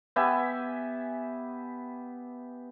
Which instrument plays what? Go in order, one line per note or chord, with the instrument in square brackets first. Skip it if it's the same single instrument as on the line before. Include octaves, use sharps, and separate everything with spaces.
[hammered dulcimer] B3 G4 E5 G#5